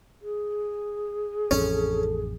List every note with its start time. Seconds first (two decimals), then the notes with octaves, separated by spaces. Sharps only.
0.21 G#4
1.51 A1 F2 C#4 A4